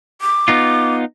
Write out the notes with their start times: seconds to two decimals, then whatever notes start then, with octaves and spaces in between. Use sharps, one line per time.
0.22 D6
0.48 B3 D#4 F4